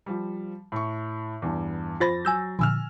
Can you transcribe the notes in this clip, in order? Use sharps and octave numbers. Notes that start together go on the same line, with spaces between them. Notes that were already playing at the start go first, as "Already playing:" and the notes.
F3 G3
A2 C#6
E2 G2
F2 F4 C5 B5 A6 A#6
F#3 G#5 E6 G6
A#2 D3 F3 G#5 E6 F6